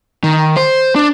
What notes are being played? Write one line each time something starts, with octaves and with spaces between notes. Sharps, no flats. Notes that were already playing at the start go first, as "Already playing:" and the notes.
D#3
C5
D4